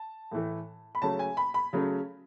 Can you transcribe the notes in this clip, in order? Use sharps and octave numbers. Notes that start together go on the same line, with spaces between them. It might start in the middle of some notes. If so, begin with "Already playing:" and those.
Already playing: A5
A2 E3 A3
B5
C#3 F#3 A3 C#4 A5
G#5
B5
B5
C#3 F#3 A3 C#4